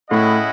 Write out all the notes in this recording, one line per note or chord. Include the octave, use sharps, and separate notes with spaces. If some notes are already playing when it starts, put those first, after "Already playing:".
A2 C#4 E4 G#4 D#5 F#5